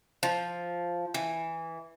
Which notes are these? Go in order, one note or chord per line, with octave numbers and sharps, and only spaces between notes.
F3
E3